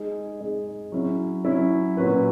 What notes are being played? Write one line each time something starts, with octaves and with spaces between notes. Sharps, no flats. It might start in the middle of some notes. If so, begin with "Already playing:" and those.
Already playing: G#3 D#4 G#4
G#3 D#4 G#4
F#3 C#4 E4
F#3 C#4 E4
A#2 F#3 C#4 F#4 B4